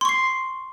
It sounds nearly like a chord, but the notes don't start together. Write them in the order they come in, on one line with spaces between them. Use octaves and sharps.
C6 C#6 C7